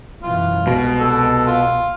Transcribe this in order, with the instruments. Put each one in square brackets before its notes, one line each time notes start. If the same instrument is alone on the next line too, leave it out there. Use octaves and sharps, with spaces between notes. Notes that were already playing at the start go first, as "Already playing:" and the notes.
[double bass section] F#2 B2 E3 [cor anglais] F4
[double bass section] C2 G#3 [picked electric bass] B2
[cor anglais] A4
F4